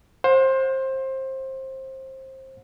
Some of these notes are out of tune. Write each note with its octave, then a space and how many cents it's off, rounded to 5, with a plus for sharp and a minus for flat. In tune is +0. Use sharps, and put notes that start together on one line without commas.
C5 +20 F#5 -40